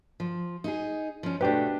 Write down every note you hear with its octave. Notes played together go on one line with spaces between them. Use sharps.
F3
D#4 E4 G#4
F3 C#4
B2 A3 D4 G4 B4